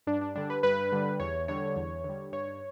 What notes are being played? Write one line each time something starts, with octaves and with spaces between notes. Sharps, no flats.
G2 D4
D4
D3 G3 D4
B4
G2 B4
D3 G3
E2 C#5
D3 G3 C#5
E2
D3 G3
G2 C#5